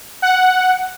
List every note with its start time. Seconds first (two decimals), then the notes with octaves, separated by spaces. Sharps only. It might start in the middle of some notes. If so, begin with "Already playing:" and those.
0.22 F#5